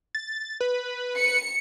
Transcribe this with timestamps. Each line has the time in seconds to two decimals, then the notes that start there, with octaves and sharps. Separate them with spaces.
0.15 A6
0.60 B4
1.17 C#7